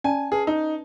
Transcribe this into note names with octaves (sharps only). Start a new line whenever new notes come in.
C#4 D5 G#5 A5
G#4 B4 A5
D#4